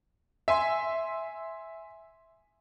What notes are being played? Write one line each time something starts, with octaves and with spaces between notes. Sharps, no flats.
E5 G#5 C6